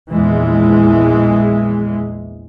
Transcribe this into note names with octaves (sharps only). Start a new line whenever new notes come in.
A#1 E2 E3 G#3